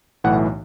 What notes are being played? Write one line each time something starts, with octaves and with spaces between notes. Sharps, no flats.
B1 A2 E3 F#5